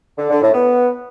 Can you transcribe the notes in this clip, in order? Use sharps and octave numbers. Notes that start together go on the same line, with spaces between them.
D3
D3
A2
B3